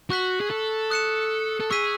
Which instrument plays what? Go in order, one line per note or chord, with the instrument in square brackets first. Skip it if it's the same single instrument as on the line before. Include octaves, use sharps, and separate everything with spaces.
[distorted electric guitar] F#4 [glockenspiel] C#6 F#6 B6 F#7
[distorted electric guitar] G#4
A4
[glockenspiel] D#6 F#6 C#7 E7
[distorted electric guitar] A4
[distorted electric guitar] G#4 [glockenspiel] C#6 E6 B6 D#7